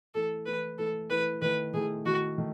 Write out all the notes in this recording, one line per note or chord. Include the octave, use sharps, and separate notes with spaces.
E3 A3 E4 A4
E3 A3 E4 B4
E3 A3 E4 A4
E3 A3 E4 B4
D#3 A3 E4 B4
D#3 A3 E4 G#4
D#3 A3 E4 F#4
D#3 A3